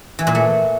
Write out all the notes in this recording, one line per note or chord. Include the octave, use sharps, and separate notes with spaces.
E3
A#2
A3